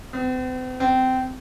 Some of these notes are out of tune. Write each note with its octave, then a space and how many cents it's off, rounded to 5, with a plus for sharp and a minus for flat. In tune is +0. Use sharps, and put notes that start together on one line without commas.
C4 -45
C4 -20